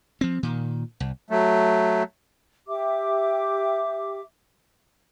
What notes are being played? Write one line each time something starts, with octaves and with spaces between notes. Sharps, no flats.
F3 C4
A#2 D#3
C2
F#3 A3
G4 E5 D6